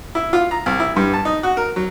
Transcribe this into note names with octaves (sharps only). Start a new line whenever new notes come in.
E4
F4
A#5
C2
E4
G2
A5
D#4
F#4
A#4
F#3